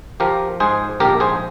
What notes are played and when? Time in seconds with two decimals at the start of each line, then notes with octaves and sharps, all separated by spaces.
0.20 F3 G4 A#4
0.60 G#2 G#4 C5
1.00 A#1 G4 A#4
1.20 G#4 C5